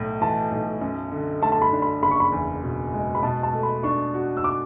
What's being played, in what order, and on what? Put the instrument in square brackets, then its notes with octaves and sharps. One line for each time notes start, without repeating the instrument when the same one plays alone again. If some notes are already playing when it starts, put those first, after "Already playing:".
Already playing: [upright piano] B1 A2
[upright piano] E3 [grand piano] A5
[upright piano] B1
F#2
D3
[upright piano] A3 [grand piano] A5
[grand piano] A5
B5
[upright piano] D4
[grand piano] B5
[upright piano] F#1 [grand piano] B5
[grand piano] C#6
B5
[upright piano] E2
B2
G#3
[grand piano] B5
[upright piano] B2 [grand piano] A5
[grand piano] A5
[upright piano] A3
[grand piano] B5
[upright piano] D4 [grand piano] C#6
[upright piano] F#4
[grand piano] E6
D6